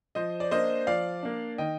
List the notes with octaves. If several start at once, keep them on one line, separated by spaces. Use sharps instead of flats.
F3 C5 D#5
D5
A#3 D4 C5 D#5
F3 D5 F5
A#3 D4
D#3 D#5 G5